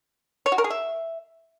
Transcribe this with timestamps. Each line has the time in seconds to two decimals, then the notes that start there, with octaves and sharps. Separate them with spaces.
0.46 C#5
0.52 F#4
0.58 A#4
0.64 G#4
0.70 E5